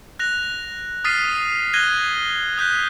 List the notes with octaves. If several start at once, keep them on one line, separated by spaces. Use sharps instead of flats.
F#6 A#6 F7
D#6 F6 A6 B6 C7 D#7
F#6 G#6 A#6 D#7 G7
D#6 F#6 G6 B6